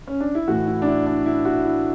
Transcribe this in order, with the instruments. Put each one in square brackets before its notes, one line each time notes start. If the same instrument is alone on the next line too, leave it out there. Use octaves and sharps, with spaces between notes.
[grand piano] C#4
D4
E4
A2 E3 F#4
E4
D4
E4
D4
E4
F#4
E4